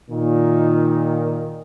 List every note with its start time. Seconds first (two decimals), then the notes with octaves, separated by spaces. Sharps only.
0.10 A#2 D#3